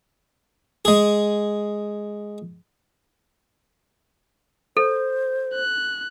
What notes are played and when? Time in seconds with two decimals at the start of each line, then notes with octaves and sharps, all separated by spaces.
0.85 G#3 G#4
4.77 A4 C5
5.55 F#6